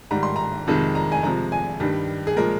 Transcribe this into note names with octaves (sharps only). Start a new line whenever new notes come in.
G#2 D#3 G3 A#5
C6
A#5
F2 C3 D#3 G#3
A#5
G#5
C3 F3 G#3 A#5
G#5
G2 D#3 G3
G#4
A#2 F3 G#3 A#4